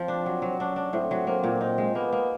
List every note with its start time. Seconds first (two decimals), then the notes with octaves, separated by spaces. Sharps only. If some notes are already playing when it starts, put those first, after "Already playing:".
Already playing: F3 C4
0.08 D4
0.26 F#3
0.42 F#3
0.59 C#4 D4
0.76 D4
0.93 A2 C4
1.11 F#3
1.27 A#3 C4
1.44 A#2
1.61 C4 D#4
1.78 G#3
1.95 A#3 B3
2.12 A#3